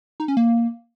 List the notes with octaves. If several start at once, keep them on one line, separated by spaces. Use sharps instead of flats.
D#4
C#4
A#3